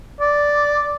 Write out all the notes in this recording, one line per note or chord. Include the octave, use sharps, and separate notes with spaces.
D5